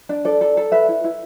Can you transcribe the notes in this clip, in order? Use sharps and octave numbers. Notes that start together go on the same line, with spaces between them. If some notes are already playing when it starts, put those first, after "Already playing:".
D4
A4 D5
A4
A4
B4 E5
E4
E4